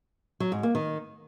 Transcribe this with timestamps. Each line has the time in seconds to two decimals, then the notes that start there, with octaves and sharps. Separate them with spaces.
0.40 F#3
0.52 G#2
0.63 A#3
0.75 D#3